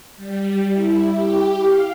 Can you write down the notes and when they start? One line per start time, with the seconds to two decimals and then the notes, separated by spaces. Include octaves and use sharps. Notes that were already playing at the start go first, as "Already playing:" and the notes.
0.17 G3
0.70 E4
1.08 G4
1.60 F5